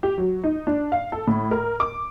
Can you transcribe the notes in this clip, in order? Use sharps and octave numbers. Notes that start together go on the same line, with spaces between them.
G4
F#3
D#4
D4
F5
A4
A2
A#4
D6